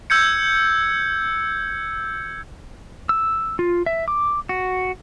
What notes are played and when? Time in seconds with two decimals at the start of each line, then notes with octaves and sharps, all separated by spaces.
0.10 E6 G6 G#6 C#7
3.09 E6
3.59 F4
3.86 E5
4.08 D6
4.49 F#4